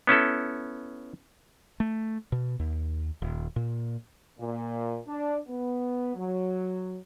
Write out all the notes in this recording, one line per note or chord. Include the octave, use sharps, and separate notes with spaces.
B3 C#4 E4 A4
A3
B2
D#2
D#1
A#2
A#2
D4
B3
F#3